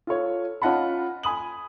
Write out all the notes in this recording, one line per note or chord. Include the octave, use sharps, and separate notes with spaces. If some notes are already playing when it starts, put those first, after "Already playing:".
F4 A4 C#5
C#4 F4 D#5 F#5 A5 B5
G#5 B5 D#6 F#7